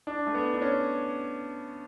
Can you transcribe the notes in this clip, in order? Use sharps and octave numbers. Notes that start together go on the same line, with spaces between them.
D4
A3
B3
D4
C#4